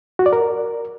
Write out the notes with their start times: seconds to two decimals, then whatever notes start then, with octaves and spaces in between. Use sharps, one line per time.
0.19 F#4
0.26 D5
0.33 A#4